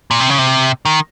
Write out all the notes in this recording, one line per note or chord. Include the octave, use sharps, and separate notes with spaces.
A#2
C3
C#3
C3
D#3